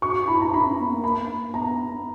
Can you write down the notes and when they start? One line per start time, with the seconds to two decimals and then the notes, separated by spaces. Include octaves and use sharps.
0.02 F#4 C#6
0.28 E4 B5
0.41 A#5
0.52 D#4 B5
0.65 C#4
0.79 B3
0.91 A#3
1.04 B5
1.54 B3 A#5